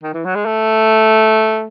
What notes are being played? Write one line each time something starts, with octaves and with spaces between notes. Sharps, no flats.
D#3
E3
F#3
G#3
A3